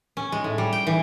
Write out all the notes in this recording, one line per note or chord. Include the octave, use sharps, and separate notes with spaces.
C#4
G#3
A2
G3
G5
E3